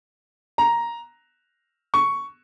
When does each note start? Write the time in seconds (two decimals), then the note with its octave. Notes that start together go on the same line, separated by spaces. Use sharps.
0.58 A#5
1.94 C#6